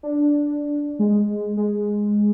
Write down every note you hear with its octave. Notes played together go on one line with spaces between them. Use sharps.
D4
G#3
G#3